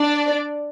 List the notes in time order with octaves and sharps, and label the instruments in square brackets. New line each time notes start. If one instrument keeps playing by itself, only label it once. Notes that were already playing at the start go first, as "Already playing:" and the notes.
Already playing: [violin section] D4 D5